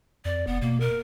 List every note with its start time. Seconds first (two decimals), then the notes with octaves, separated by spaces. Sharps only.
0.25 F2 D5
0.47 F1 B3
0.62 B2 A#3
0.80 A#4